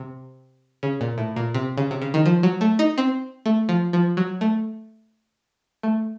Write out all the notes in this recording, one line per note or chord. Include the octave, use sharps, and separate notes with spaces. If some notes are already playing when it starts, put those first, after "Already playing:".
Already playing: C3
C#3
A#2
A2
A#2
C3
C#3
C3
C#3
D#3
F3
F#3
A3
D#4
C4
A3
F3
F3
F#3
A3
A3